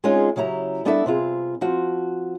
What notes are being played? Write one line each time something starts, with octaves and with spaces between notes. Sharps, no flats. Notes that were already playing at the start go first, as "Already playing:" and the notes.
G#3 C4 C#4 D#4 F4 G#4
C#3 F#3 E4 G4 A#5
G3 B3 D4 E4 A4 E5
C3 C4 F4 G#4
F3 C4 F#4